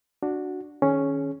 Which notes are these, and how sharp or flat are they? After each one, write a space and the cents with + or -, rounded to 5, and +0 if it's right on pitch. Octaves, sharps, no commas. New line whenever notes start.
D4 +0 F#4 -5
D#3 +0 C#4 +0 G#4 +20